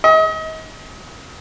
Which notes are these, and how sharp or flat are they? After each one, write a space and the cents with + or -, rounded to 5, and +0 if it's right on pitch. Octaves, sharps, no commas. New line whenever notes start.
D#5 +35